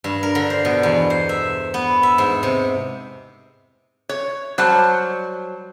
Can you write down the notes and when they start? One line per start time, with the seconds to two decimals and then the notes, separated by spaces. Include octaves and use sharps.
0.04 G2
0.23 A#4
0.35 D3
0.50 C5
0.65 B2
0.83 E2
1.10 C5
1.29 E5
1.74 B3
2.03 E5
2.18 G#2
2.43 C3
4.09 C#5
4.58 F#3 G3 C5 F#5 A5